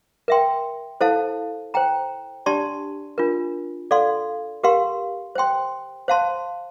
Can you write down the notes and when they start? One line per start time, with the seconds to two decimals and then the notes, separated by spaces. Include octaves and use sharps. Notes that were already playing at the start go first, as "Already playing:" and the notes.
0.28 A#4 E5 G5 C6
1.01 E4 A4 C5 F5 A5
1.74 C5 G5 A#5
2.46 D4 G4 D5 A5 C6
3.18 D4 F4 A#4
3.91 A4 D5 F5 C6
4.63 G4 A#4 F5 C6
5.35 C5 G5 C6
6.08 C5 F5 A5 C6